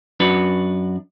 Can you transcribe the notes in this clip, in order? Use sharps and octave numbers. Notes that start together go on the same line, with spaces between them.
F#2 D4 F#4 B4